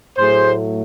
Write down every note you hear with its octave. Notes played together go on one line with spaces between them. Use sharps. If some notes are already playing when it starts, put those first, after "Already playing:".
A2 F#3 A3 G#4 C5